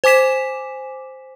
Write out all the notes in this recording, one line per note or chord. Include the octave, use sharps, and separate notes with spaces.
C5 G#5 D6 B6 E7